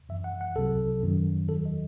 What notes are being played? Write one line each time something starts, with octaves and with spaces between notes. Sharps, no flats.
F#2 E3 E5
F#5
F#5
C2 C3 F#3 A4
F#2 D#3 F#3
E2 D#3 F#3 A4
D#5